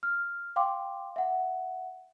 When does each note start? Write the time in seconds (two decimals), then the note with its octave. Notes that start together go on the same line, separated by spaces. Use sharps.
0.03 F6
0.56 F5 G5 C6 D6
1.16 E5 F#5